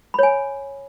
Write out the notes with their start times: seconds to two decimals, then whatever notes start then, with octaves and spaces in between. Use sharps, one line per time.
0.14 B5
0.19 C#5
0.23 G#5